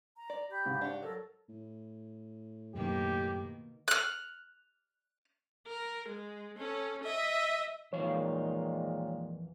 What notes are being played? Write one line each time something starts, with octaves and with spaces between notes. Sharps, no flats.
A#5
D5
G4 B5 G6
G#2 C#3 C5
D4 G4 F#5
F#3 A4 A#4
A2
F#2 B2 D#3 A#3 G4
F6 F#6
A#4
G#3
C#4 A4
D#5 E5
F2 A#2 D#3 E3 G#3 C#5 F5